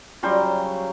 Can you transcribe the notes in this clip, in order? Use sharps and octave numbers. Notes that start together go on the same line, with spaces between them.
C#3 F#3 G3 C5